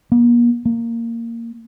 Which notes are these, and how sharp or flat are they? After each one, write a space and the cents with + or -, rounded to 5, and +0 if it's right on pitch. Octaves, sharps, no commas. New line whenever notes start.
A#3 +40
A#3 -10